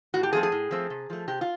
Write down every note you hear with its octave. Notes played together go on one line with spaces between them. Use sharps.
A2 F#4
G4
F3 A3 C4 G#4
G#4
A2
F3 A3 C4
C3
F3 A3
C3 G4
F4